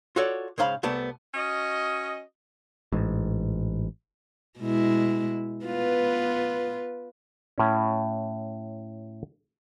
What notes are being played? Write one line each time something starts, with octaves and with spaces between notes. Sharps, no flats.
F4 F#4 A4 C#5 D5
G#2 C#3 C5 F5 A#5 B5
C2 A3 B3 D5 A5
C#4 F#4 D#5
A1 G#2
B2 G#3 E4
B3 F4 B4
A2 C#4